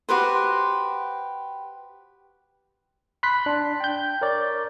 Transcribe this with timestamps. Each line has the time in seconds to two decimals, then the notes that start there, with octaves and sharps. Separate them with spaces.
0.09 F#4 G4 B4 C5
3.23 B5 C6 F#6 B6
3.46 D4
3.80 G5 G6
4.22 A#4 C#5 D5